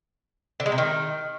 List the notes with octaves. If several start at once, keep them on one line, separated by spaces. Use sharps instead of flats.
D3
G#3
C3
D#3